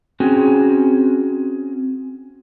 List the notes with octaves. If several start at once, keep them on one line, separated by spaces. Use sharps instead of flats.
C4 C#4 F#4 G#4 G5 G#5